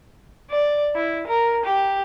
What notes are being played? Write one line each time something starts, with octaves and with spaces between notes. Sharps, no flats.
D5
E4
A#4
G4